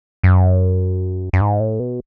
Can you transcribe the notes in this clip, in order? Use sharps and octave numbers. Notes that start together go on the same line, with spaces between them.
F#2
F#2
G#2
A2
B2